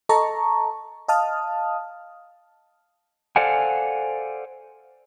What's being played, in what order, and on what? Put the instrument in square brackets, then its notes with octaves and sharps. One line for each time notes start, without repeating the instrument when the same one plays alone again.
[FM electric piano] A4 D#5 A5 A#5 C#6
D#5 F5 A5 D#6 F6
[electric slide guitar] A4 C5 D5 F5 F#5 G#5